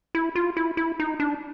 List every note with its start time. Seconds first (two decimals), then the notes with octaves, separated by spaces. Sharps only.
0.15 E4
0.35 F4
0.57 E4
0.77 E4
1.00 D#4
1.20 D4